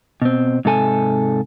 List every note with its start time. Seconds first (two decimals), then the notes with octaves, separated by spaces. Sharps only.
0.22 B2 C4
0.65 G#2 C3 A4 G#5